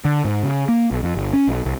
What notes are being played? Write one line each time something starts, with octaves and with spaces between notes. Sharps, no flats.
D3
G#2
C#3
A#3
B1
F2
G1
C#4
B1
C2